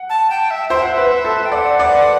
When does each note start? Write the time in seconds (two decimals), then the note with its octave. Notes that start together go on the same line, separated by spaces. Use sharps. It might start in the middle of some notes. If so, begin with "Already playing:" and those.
Already playing: F#5
0.10 A5
0.30 G5
0.50 E5
0.70 C5 E5
0.82 F#5
0.94 B4 E5
1.25 A4
1.45 G5
1.52 D5 F#5
1.79 D5